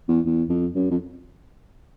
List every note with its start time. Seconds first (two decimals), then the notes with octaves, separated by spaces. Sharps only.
0.08 E2
0.26 E2
0.49 F2
0.75 F#2
0.91 F2